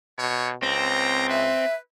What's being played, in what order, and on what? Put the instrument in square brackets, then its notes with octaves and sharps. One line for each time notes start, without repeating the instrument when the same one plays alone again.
[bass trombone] B2 [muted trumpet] C#5
[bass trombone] C#2 [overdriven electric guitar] C4 [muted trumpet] A#5
[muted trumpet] B4 [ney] E5